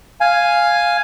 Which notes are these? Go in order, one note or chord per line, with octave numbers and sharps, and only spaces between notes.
F5 G#5